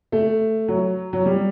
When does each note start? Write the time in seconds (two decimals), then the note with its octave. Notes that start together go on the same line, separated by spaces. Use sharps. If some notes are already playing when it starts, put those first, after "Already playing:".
0.12 A3
0.68 F#3
1.13 F#3
1.26 G3